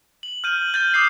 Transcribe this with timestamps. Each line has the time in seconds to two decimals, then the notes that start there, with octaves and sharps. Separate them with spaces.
0.23 F#7
0.44 F6 G6 D#7
0.74 G6 A6 F#7 G7
0.94 D6 D#6 G6 C7